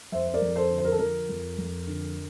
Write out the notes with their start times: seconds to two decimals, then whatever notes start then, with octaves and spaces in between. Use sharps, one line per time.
0.12 F2 C5 E5
0.27 C5
0.34 A#4 D5
0.42 F2
0.56 A4 C5
0.70 D3
0.78 C5
0.85 A#4
0.92 A4
0.99 F3 A#4
1.29 F2
1.58 F2
1.87 D3